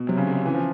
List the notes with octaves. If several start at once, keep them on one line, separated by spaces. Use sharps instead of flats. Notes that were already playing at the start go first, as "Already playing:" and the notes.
Already playing: B2
C3 F#3
C#3
D3 D4
E3 C#4
F3